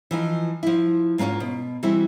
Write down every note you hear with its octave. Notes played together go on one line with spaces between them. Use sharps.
E3 F3 D#4
F3 E4
G#2 A#3 B3 C#4 F4
B2
E3 G3 C4 E4 F#4